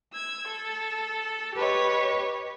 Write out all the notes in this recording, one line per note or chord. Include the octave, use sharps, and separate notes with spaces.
E6 G#6
A4
G4 B4 C#5 D#5